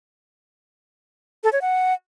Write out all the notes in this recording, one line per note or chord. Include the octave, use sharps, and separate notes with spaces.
A4
C#5
F#5